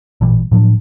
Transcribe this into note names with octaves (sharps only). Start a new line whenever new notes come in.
A1 A#2 E3 G3
A2 F3 F#3 D4